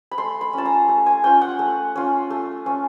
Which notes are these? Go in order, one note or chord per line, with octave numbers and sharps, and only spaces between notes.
B5
A3 C6
B5
C#4 F4 A5
A#5
A3
G#5
C#4 F4 G5
F#5
A3
C#4 F4
A3
C#4 F4